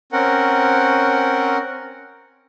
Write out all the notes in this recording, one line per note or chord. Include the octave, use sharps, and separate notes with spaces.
C4 C#4 A#4 F#5